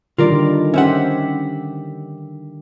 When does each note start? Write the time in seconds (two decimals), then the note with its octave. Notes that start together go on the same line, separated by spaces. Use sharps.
0.18 D3 D#3 G3 F4 A#4 D5
0.74 C#4 G4 C5 E5 F#5